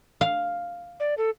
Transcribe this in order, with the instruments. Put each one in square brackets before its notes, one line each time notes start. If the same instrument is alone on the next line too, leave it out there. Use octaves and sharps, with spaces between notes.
[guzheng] F5
[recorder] D5
A4